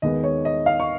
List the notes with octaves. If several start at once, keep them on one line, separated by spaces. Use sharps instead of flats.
D#2 D#3 G#3 B3 D#4 D#5
C#5
D#5
F5
C#6